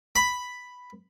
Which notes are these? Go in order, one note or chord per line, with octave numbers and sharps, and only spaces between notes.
B5